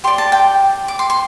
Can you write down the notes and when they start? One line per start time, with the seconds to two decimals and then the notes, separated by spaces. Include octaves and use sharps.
0.04 G4 D5 C6
0.18 A5
0.32 G5
0.88 D6
0.99 C6
1.10 C6